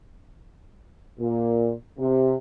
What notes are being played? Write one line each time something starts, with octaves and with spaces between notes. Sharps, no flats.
A#2
C3